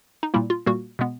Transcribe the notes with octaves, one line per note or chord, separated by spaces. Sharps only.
D#4
A#2 G3 A#3 E4
F4
A#2 G3 A#3 F#4
B2 G#3 B3